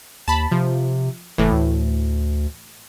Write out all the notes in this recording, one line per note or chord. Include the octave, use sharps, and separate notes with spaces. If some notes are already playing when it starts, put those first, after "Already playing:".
D#2 A5 B5
C3 F3
F#1 A2 E3
D2